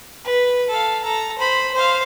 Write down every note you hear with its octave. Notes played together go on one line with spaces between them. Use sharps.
B4
A4 F5
A4 A#5
C5 B5
C5 F5